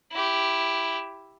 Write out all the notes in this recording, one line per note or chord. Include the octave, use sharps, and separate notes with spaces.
E4 G4